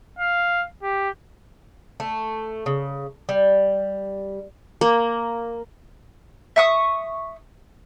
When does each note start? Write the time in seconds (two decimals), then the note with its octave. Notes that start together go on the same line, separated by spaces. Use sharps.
0.19 F5
0.83 G4
2.00 A3
2.66 C#3
3.29 G3
4.81 A#3
6.56 E5 C#6 D#6